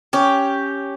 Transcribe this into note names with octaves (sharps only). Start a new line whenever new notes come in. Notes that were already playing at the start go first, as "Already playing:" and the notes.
C#4 G4